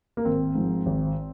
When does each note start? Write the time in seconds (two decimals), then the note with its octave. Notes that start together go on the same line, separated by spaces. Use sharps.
0.17 A#3
0.25 G#1 C4
0.55 G#2 F3
0.86 G#1